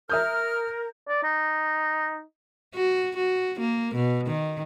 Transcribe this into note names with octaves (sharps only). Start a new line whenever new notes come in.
A#4 E5 D#6 F6 G6
D5
D#4
F#4
F#4
A#3
B2
D#3